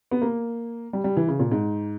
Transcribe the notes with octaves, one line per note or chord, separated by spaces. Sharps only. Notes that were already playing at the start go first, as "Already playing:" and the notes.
B3
A#3
G3
G3
E3
C#3
A#2
G#2